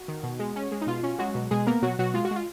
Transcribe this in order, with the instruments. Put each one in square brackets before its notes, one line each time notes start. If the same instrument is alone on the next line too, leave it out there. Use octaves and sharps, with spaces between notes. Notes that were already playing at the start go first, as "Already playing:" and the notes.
Already playing: [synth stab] F#4
D#3
B2
G#3
C#4
G#3
D#4
B2 F4
C#4
F#3 G#3 F#4
B2
B2 G#3 G#4
A#3 B3 A#4
B2 F#3 F#4
B2 F#3 F#4
G#3 F4
F#4
G#3 F4